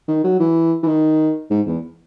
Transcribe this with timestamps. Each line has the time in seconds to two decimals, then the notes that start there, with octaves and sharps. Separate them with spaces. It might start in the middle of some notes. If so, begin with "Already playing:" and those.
0.08 D#3
0.24 F#3
0.40 E3
0.83 E3
0.87 D#3
1.50 G#2
1.67 E2